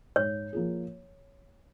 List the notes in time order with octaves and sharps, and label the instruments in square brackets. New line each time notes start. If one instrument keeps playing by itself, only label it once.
[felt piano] G#2 [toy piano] C#5
[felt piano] F3 A#3 F4 G#4